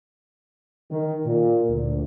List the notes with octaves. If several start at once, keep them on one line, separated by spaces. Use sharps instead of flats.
D#3
A#2
D2